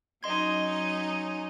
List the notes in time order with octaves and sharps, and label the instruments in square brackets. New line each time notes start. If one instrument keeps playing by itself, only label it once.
[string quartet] F#3 C#4 D#4 [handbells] D#5 C6 G#6